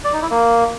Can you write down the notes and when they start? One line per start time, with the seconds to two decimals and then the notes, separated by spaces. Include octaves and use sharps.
0.04 D5
0.13 D#4
0.22 E4
0.31 A#3